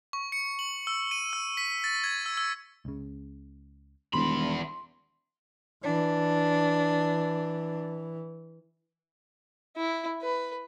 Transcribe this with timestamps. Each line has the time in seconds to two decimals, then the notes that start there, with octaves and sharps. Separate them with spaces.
0.13 C#6
0.32 C#7
0.59 F#7
0.87 E6
1.11 D#7
1.33 E6
1.57 B6
1.84 A6
2.04 G#6
2.26 E6
2.37 E6
2.85 C#2 C#3
4.14 E1 E2 D#3 G3 B5 C6
5.83 E3 D4
9.77 E4
10.22 B4